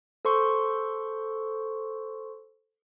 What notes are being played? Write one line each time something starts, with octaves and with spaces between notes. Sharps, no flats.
A4 C5 C6 C#6